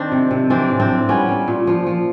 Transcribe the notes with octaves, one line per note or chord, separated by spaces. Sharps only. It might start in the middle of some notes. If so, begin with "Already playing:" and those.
Already playing: D#3 C4 D4
C3
C3
E3 C4 D4
A2
C4 D4
A2
G3 B3 C#4
G3
A#2
F3
F3